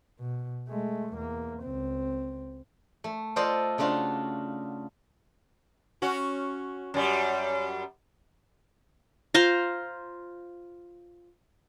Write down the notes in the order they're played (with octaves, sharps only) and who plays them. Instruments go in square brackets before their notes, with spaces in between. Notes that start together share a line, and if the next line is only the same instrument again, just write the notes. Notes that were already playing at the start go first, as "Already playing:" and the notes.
[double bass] B2
G#3 A3
E2 A#3
C#2 C4
[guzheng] A3
F4 A4 C5 D5 D#5
C#3 A3 D4 F4 F#4
[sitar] C#4 F#4
F#2 G3
[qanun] F4 C5 F5 A#5